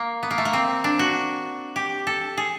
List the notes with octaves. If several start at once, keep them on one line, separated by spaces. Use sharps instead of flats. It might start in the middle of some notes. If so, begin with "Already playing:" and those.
Already playing: A#3
B3
A#3
A3
A#3
C4
D4
F#4
G4
A4
G#4